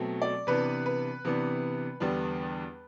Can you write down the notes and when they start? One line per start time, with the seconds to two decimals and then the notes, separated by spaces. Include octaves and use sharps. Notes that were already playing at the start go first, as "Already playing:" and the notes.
Already playing: B2 F#3 A3 C4
0.22 D5
0.47 C3 E3 B3 D4 B4
0.86 B4
1.25 C3 E3 B3 D4
2.00 E2 D3 G3 B3 D4